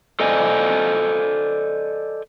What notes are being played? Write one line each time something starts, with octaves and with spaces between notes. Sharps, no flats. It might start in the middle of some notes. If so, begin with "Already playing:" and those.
A4 C5 D5 D#5 G#5